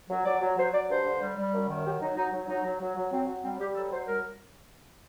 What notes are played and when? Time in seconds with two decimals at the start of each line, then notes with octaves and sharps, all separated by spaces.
0.10 F#3
0.25 F#3 D5
0.41 F#3
0.57 F#3 C5
0.73 F#3 D5
0.89 G2 C5
1.05 D3
1.21 G3
1.36 G3
1.53 F#2
1.68 D#3
1.84 F#3 G4
2.00 F#3 D#4
2.16 F#3 D#4
2.32 F#3
2.48 F#3 D#4
2.64 F#3
2.80 F#3
2.95 F#3
3.11 F#3 C4
3.27 F#3
3.43 G3 C4
3.59 G3 G4
3.75 F#3 A4
3.91 F#3 C5
4.07 G3 A#4